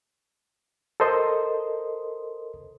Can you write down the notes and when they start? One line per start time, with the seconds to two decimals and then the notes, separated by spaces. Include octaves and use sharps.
1.00 A4 A#4 C5 D#5 C6 D#6